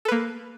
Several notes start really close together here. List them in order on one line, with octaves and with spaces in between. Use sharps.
A4 B4 A#3